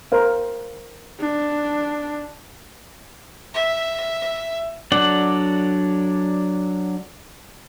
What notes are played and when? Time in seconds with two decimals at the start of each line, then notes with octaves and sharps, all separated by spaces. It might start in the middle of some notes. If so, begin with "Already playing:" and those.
0.12 A#4 C5 F5
1.20 D4
3.54 E5
4.92 F#3 D4 A4 D5 F#5